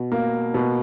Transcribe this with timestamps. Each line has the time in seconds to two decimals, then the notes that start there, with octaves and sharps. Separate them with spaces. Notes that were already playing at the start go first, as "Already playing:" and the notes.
Already playing: B2
0.12 A#3
0.54 B2